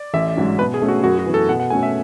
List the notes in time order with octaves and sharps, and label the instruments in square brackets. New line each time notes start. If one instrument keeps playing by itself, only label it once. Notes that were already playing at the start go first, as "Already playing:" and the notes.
Already playing: [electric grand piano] D5
[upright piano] A1 [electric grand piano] E5
[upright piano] G#2 F#3 C#4
[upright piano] B2 [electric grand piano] B4
[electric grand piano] G#4
[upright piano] A3 C#4
[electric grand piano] F#4
[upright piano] F#2 [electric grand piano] F#4
[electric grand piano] F#4
[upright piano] E3 B3
[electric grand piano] A4
[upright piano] B2 [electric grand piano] F#5
[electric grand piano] F#5
[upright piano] A3 C#4 F#4 [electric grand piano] G#5
[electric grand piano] E5